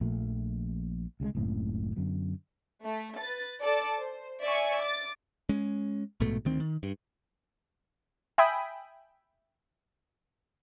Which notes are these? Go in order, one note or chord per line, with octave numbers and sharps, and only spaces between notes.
A#1 A#2 F3 A3
C2 C#3 F#3 G#3
F#1 C#2 A2 C4
F#2 D3 F#3 B3
A3
B4 A6
A4 D5 A5 D6
C5
D5 E5 G#5 C#6
D6 A6
G#3 C#4
A#1 G#2 B2 A3
D2 D#3 C4
D#3
G2
E5 G5 G#5 B5 D#6